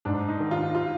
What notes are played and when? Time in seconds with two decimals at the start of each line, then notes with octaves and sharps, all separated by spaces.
0.05 G#2 D4
0.28 D#4
0.40 D#3
0.51 F4
0.75 F4